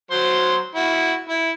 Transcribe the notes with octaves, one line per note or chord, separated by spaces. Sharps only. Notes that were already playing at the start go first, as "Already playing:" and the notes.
F#3 C5 C6
E4 F#4
E4